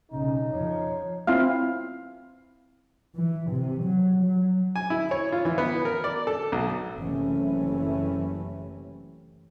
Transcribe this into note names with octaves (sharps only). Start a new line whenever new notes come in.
B1 C#3 C#4 D#4
F2 F3 C#5
C4 E4 F4 F5
E3
C3
F#3
F#3
G#5
E4
C#5
F4
E3
B3
A#4
D5
A4
B1
F#1 C3 E3 A3 C#4